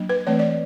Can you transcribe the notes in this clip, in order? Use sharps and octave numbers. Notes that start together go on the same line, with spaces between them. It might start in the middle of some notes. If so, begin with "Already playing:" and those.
Already playing: F#3 A#3 D4
B4
E3 A3 C4 C#5
D5